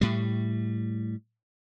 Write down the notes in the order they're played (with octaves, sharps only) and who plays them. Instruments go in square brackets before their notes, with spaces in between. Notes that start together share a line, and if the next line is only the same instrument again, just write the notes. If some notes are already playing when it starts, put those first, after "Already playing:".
[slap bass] A2 G3